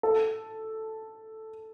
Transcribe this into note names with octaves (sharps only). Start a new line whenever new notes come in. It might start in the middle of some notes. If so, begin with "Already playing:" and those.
A4